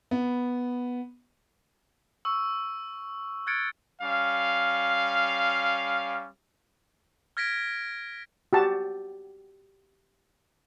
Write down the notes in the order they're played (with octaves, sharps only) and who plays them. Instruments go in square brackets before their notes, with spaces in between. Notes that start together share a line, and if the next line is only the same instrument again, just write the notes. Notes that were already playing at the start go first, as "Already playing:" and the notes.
[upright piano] B3
[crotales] C#6 E6
F6 F#6 G#6 A6 C#7 D7
[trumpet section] G3 C#4 F5
[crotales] F6 G#6 A#6 B6 D7
[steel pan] F#4 G4 A5